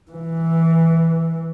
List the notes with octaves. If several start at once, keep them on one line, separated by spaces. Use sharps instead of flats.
E3